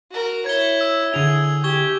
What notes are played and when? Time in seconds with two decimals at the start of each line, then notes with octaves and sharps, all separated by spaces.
0.11 F#4 A#4
0.46 E4 C#5 G#6 G7
0.81 E6
1.14 D3 E4 G#4 F7
1.64 G4 C#6 G#6 G7